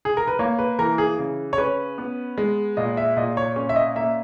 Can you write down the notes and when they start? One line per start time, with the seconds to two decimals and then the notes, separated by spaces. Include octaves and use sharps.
0.05 G#4
0.17 A#4
0.28 B4
0.39 A#3 C#5
0.59 B4
0.79 E3 A#4
0.98 G#4
1.19 C#3
1.53 C#5
1.58 C#4 B4
1.98 B3
2.38 G#3
2.77 A#2 D#5
2.97 E5
3.17 A#2 D#5
3.37 C#5
3.56 C#4
3.69 E5
3.76 D#5
3.96 A#3 E5